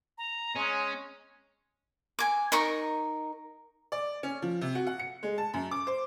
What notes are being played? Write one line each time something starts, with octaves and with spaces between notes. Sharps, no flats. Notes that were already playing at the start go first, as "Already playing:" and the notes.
A#5
G#3 C#4
G#5 D6
D#4 A#4 C#6
D5
C#4
F3
C3
F#4
F#5
C#7
G#3
A5
F#2
D6
C5